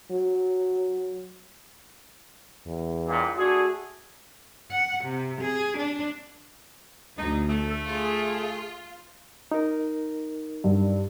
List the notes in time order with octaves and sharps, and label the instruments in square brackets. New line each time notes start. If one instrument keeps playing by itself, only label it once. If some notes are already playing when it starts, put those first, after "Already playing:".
[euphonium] F#3
[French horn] E2
[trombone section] C#2 G2 A#2
[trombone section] A3 D4 G#4 [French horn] F#4
[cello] F#5
C3
G#4
D4
[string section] D2 [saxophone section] D#4
[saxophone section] A3 [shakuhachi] A4
[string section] F4 [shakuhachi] G#4
[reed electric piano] D#4 A#4
[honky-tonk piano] G2